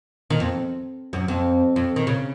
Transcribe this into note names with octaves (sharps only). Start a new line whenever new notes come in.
D#3
F2
F#2
F2
F2
D#3
C#3